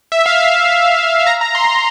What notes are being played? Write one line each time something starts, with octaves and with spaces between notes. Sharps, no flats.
E5
F5
E5
A#5
A#5
C6
A#5